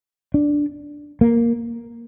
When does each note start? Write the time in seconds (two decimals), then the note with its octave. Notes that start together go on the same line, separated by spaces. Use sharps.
0.34 D4
1.21 A#3